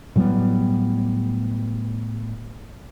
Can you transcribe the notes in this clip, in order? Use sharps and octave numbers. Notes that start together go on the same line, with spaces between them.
A2 F#3 G3 B3